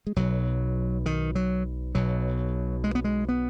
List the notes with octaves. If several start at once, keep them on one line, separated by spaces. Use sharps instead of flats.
G#3
B1 B2 F#3
D#3
F#3
B1 B2 F#3
G#3
B3
G#3
B3